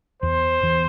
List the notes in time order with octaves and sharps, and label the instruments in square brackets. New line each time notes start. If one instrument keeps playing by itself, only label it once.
[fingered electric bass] E2 E3 [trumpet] C5
[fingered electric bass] E2 E3